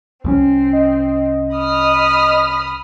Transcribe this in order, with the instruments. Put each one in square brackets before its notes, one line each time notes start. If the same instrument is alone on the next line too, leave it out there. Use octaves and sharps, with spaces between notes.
[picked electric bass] C2 G3 C#4 [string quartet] C4
[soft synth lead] D#5
[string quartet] B5 D#6 F6